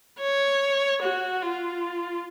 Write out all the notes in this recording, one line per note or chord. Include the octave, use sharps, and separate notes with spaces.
C#5
F#4
F4